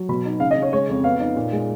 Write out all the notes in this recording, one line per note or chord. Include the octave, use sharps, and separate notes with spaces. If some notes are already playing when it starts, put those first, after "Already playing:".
Already playing: F#3
B2 B5
D#4
C#3 F5
D#5
C#3
C#5
G#3 C#5
F2
B3 F5
D#4
A#2
G#3